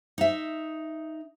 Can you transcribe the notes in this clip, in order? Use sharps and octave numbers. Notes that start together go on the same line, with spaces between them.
D#4 E5